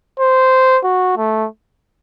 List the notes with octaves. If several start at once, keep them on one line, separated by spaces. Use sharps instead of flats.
C5
F#4
A3